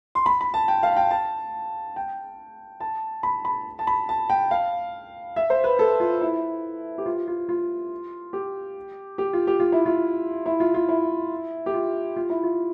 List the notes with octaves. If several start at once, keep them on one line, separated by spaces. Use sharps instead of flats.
C6
B5
B5
A5
G5
F5
G5
A5
G5
A5
B5
B5
A5
B5
A5
G5
F5
E5
C5
B4
A4
F4
E4
G4
F4
F4
F4
G4
G4
F4
G4
F4
E4
F4
E4
F4
F4
E4
G4
F4
F4
E4
F4